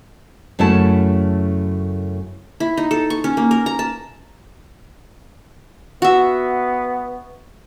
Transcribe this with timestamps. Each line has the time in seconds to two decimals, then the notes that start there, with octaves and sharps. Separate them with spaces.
0.59 F#2 C#3 A3 E4 C#5 A5
2.60 E4
2.77 D#4
2.91 A4
3.10 C#6
3.24 C#4
3.37 A#3
3.51 A#4
3.66 A#5
3.79 A5
6.02 B3 F#4 E5